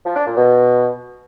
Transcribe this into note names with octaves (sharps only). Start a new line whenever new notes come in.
F3
D4
A#2
B2